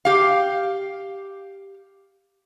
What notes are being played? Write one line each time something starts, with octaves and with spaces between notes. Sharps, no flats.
G4 F5